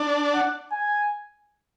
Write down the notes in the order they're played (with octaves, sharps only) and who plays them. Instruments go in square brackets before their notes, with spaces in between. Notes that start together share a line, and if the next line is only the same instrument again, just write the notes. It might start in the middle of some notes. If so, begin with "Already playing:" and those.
Already playing: [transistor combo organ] D4
[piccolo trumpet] F#5
G#5